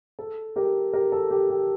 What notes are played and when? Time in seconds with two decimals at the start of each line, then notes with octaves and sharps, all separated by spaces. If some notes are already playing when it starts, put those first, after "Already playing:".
0.19 A4
0.56 G4 A#4
0.93 G4 A#4
1.12 A4
1.30 G4
1.50 G4